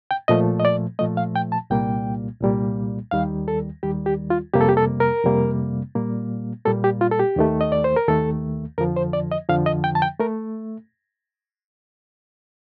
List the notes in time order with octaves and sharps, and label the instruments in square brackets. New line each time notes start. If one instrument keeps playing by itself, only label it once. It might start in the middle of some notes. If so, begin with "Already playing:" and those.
[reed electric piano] G5
A#2 F3 A3 D#5
D#5
D5
A#2 F3 A3 D#5
F5
G5
A5
C2 A#2 G3 A#3 G5
C2 A#2 G3 A#3
D#2 D#3 G3 F5
A4
D#2 D#3 G3 G4
G4
F4
F2 C3 G3 A#3 G4
A4
G4
A4
A#4
F2 C3 G3 A#3
A#2 G3 A#3
A#2 G3 A#3 A4
G4
F4
A4
G4
D#2 D#3 A3
D#5
D5
C5
A#4
D#2 D#3 A3 A4
F2 D3 F3 A#4
C5
D5
D#5
F2 D3 F3 F5
D#5
G5
A5
G5
A3 A#4